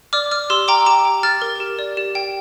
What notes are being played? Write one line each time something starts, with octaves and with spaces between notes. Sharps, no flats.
D5 D6 F6
D5 D6 F6
G4 C6 E6
G5 A#5 D6
G4 A#5 D6
G5
G4 F6 A6
A#4
G4
D5
G4
G5